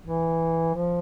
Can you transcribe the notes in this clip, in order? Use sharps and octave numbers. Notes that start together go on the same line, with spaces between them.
E3
F3